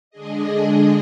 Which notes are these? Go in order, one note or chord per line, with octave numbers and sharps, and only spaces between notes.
D3 G#3 D4 G#4 D#5